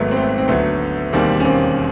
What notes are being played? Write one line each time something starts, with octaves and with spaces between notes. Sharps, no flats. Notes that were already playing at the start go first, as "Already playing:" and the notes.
Already playing: G#1 G#2 D#3 F#3 A3 B3
C4
A3 B3
C4
D2 D3 F#3 A3 B3
E1 D#2 D#3 G3 A#3 C4
C#4
A#3 C4